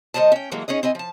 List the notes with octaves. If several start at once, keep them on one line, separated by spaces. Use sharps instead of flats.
A2 D#3 C5 D#5 A5
C#4 G5
A2 E3 F#3 G#3 A#3
C#4 D#4 G#4 D#5
C4 E4 D#5 G#5
F3 A5